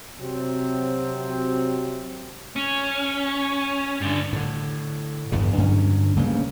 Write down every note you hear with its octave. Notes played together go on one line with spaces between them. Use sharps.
C3 F#3 C4
C#4
G2 D3
A2 D3
G1 E2 G2 C#3
G2 D3 F#3 C#4
D1 G2 C#3 A#3